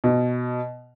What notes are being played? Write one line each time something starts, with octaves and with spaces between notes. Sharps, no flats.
B2